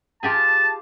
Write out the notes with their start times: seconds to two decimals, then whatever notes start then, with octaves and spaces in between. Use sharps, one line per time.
0.23 F4 G4 G#4 A5